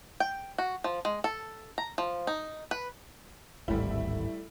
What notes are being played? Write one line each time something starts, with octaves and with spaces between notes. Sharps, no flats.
G5
F#4
F3
G#3
A4
A#5
F3
D#4
B4
D1 G#1 G3 A3 E4